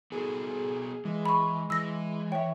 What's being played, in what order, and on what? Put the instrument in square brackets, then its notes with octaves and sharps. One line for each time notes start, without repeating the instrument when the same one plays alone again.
[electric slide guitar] B3 F#4 A4 [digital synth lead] G#4
[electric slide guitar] E3 [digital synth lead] G#3
[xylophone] B5 C#6
[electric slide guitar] E3 [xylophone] E6 A#6
[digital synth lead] C#5 [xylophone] E5 G5